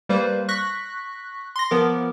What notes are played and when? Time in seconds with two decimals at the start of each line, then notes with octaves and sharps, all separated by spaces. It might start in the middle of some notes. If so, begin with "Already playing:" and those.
0.09 G3 A#3 B4 C5
0.49 C#6 F#6 A#6 B6
1.56 C6 A#6
1.71 F3 B3 A#4 D6